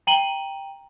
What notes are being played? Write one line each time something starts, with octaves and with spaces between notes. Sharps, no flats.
G5 A#5 D#7 F#7 G7